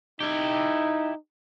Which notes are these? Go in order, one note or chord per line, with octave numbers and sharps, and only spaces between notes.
D#4 E4 G4